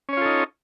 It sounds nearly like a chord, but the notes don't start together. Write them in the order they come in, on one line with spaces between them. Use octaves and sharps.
C#4 C#5 F4 A4 D#4